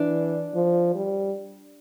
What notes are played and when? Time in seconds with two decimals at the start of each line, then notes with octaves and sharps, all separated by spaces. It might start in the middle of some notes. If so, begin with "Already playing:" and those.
Already playing: E3 D4
0.54 F3
0.95 G3